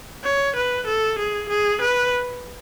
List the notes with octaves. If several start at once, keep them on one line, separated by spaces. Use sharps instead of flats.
C#5
B4
A4
G#4
G#4
B4